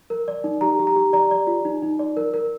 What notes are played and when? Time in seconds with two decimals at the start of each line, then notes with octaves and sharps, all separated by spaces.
0.10 A#4
0.28 D5
0.44 D#4
0.61 G4 A#5
0.79 G4
0.87 A#5
0.96 G4
1.13 D5 A#5
1.31 D5
1.47 F4
1.65 D#4
1.82 D#4
1.99 D5
2.17 A#4
2.34 A#4